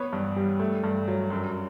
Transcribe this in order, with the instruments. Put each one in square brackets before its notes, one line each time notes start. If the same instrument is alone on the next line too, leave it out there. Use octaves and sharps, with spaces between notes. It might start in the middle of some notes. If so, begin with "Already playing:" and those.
Already playing: [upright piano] B3 B4 C#5
G2
G3
A3
G2
F#3
F#2